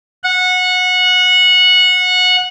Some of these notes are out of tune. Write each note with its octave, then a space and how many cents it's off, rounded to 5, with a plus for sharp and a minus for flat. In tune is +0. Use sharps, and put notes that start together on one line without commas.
F#5 -20